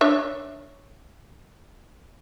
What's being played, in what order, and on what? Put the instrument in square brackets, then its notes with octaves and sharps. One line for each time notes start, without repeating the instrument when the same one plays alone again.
[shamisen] D4 C#5 E5